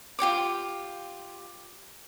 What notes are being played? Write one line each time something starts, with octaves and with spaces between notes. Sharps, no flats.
F4 G4 C#5 D6